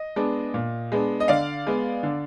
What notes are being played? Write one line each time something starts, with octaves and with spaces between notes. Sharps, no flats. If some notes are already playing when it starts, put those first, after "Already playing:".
Already playing: D#5
G#3 B3 D4
A#2
G#3 B3 D4
D#5
D3 D5 F5
G#3 B3
D3